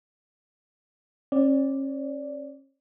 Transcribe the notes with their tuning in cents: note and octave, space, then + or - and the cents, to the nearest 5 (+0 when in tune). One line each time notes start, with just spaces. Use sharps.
C#4 -40 D5 -5